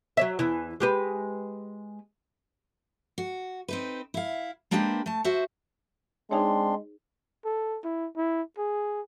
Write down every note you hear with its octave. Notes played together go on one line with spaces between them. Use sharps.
F#3 C#5 E5
E2 E3 E4
G#3 G4 B4
F#4
C4 D#4 B4
E4 F5
G#3 A#3 D4 G4 B4 C5
A3 A5
F#4 C5 E5
G#3 C4 D4 D#4 G#4 C#5 C6
A4
E4
E4
G#4